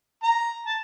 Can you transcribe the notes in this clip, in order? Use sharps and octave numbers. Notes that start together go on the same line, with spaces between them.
A#5
A5